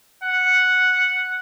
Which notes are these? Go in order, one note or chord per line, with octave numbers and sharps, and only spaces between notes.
F#5